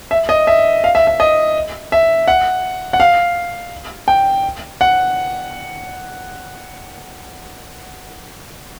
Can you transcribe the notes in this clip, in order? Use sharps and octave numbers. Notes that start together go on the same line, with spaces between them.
E5
D#5
E5
F5
E5
E5
D#5
E5
F#5
F#5
F5
G5
F#5